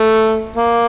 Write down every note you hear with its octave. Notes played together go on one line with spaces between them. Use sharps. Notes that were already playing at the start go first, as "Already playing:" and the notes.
Already playing: A3
A#3